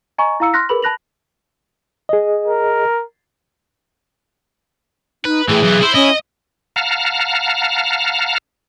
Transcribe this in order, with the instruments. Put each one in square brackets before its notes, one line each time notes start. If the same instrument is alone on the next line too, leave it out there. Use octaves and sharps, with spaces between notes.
[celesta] D#5 G#5 A#5 C#6
E4 F5 A#5 E6 C#7
C6 F6 F#6 A#6 B6
G#4 A#4 B4 B5 F#7
A5 B5 F#6 A#6 F7 F#7
[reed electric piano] G#4 D#5
[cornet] A#4
[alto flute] D#4 [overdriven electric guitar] B4
[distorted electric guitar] A2 [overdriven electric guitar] E3 [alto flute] G#4
[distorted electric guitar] B1 [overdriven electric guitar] E3
[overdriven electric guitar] E4 [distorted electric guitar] C5
[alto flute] C#4 [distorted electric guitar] D#5
[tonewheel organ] F5 F#5 A5 A#5 F6